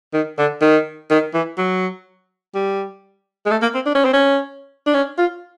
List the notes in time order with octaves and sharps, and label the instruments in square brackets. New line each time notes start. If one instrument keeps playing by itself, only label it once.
[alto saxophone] D#3
D3
D#3
D#3
E3
F#3
G3
G#3
A3
A#3
C4
D4
C#4
C4
C#4
D4
C#4
F4